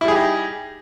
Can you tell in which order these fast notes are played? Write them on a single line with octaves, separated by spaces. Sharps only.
E4 G3 G#4 G4 D#4